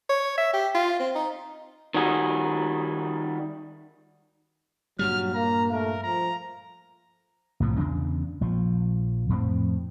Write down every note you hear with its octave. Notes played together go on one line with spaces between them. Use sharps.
C#5
E5
G4
F4
C4
D#4
D#3 G3 F#4 G#4
G2 A#2 F#3 G3 F6
A#3 A#5
A3 A#4
F3 A#5
C2 A2 C3 F3
E2 C#3 D4
A#1 F3
F2 A2 C4